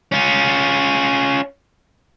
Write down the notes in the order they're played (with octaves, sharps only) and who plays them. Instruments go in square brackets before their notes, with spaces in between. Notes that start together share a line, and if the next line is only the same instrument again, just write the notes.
[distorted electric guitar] C#4 F4